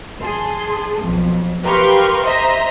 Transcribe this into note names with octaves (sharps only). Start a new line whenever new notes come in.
G#4 A5 C6
B1 F2
G4 A#4 B4 F5 C6 C#6
C5 D#5 E5 A#5 B6